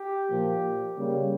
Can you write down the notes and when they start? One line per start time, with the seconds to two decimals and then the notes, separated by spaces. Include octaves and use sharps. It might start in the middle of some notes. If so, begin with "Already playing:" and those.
Already playing: G4
0.29 A#2 F3 A#3
0.97 C#3 G3 A#3